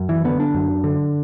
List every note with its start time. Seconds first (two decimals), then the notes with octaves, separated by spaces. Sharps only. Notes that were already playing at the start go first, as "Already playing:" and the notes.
Already playing: F#2
0.09 E3
0.24 D3 B3
0.40 D4
0.54 F#2
0.84 D3